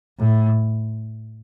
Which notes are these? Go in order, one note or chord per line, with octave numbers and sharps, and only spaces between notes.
A2